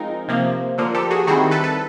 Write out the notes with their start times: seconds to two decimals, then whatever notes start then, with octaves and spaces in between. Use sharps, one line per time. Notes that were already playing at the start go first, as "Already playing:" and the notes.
Already playing: F3 G#3 C4 D#4 A#4
0.28 C3 F3 A#3
0.78 D3 F3 A#3
0.95 G4 A4
1.11 F#4 G#4
1.27 D#3 G3 C4 E4 F#4 G#4
1.51 A4 B4
1.64 A4 B4